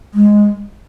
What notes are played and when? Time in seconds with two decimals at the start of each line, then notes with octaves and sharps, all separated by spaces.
0.14 G#3